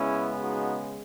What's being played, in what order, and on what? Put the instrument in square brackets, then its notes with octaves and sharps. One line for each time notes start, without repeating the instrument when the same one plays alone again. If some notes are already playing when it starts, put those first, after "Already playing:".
Already playing: [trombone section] C#3 G#3 B3 C#4 E4
D#4 F#4